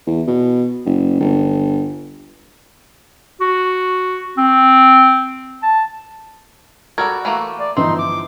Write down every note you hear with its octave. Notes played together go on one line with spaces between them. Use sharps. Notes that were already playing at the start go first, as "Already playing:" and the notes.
E2
B2
F#1
G1
F#4
C4
A5
G3 F#4 A4 A#4 G#6
E3 A3 A#3
D5
G1 E3 F3 C4 D#4 C6
D6